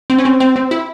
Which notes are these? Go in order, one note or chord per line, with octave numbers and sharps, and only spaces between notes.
C4
C#4
C4
C4
C4
E4